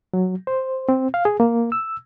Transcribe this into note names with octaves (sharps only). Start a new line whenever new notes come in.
F#3
C5
C4
F5
G#4
A#3
E6